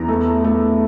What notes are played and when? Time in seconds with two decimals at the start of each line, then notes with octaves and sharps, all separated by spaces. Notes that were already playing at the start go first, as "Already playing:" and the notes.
Already playing: E2 B3 A#5
0.08 A3
0.44 A3